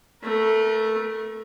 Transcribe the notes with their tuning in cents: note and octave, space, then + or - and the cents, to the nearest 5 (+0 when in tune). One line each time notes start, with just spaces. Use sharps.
A3 +0 A#4 +35